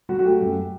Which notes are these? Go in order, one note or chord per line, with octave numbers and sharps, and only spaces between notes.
F#3 F#4
F#4
A3 G4
F#2